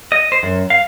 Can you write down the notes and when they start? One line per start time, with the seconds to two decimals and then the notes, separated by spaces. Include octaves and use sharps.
0.12 D#5
0.32 C5
0.43 F#2
0.70 F5